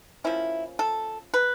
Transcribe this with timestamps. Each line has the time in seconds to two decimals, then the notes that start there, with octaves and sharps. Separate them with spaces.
0.24 F3 A#3 C#4 E4
0.79 A4
1.34 B4